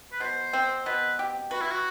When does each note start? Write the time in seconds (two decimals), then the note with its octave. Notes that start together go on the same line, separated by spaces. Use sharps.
0.12 B4
0.20 B2 C5
0.53 C4
0.86 B2 B4
1.19 G4
1.51 F#4 B4
1.61 E4
1.71 F#4